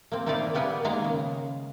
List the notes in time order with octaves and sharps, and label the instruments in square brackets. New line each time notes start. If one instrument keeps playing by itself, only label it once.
[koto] A#3 C4
A#3 C4 D#4 E4 D5 F5
G3 A#3 B3 A#4 G#5
D#3 G#3 A#3 F5 A#5
C#3